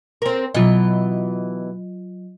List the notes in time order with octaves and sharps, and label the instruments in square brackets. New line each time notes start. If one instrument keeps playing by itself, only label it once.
[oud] C4 A#4
[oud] B2 E3 [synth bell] F#3 F4 D#5